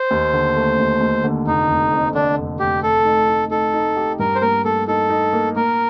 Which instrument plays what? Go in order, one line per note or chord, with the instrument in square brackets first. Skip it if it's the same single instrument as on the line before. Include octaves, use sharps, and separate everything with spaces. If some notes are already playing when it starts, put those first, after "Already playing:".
Already playing: [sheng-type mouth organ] C5
[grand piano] D#2
D3
A3
D#2
D#2
D3
[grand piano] F1 [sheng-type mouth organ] D#4
[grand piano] F1
F2
[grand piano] D3 [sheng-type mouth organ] D4
[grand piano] F1
[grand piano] F1 [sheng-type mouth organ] G4
[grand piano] A3 [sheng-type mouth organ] A4
[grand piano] D#4
D#4
[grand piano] D#4 [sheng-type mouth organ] A4
[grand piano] D#4
G4
[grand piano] G2 [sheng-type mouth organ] A#4
[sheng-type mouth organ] C5
[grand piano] A#3 [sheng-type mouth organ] A#4
[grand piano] A#3 [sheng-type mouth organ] A4
[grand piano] D#4 [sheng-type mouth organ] A4
[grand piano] D#4
A#3
[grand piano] A#3 [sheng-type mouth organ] A#4